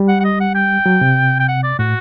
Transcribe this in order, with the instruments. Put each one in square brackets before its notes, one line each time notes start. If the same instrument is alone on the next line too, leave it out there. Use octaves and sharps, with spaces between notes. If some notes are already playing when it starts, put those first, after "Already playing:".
Already playing: [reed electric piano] G3
[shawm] F#5
F#5
D#5
F#5
G5
[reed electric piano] F#3
C3
[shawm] G5
F#5
D5
[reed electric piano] A2 [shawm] F#4